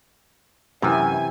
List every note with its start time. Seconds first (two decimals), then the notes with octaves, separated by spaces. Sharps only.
0.82 F#2 C3 E3 G#5